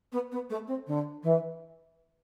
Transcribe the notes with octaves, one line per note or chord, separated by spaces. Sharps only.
B3
B3
A3
C4
D3
E3